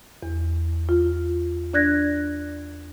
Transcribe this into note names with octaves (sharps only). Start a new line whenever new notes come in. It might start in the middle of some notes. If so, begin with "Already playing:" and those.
E2
F4
D4 D5 F#6 G#6 A#6